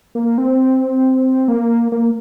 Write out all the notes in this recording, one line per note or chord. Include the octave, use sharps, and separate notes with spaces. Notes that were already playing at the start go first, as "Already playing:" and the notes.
A#3
C4
A#3
A#3